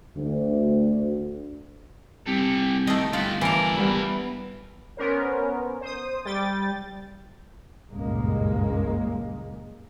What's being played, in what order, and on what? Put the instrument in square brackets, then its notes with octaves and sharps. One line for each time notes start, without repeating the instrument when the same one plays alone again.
[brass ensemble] D2
[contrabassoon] C2 [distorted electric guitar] G4 A4
[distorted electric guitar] D#3 [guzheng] A3 D#5
[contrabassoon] G1 [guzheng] F4 [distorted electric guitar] G4 F#5
[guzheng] E3 D4 [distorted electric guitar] E4 A#4
[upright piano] G3 B3
[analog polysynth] B3 C#4 A#4 C5
C5 D#6
G3 G5 A6
[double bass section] F#1 C#2 G2 A#2 G#3 A#3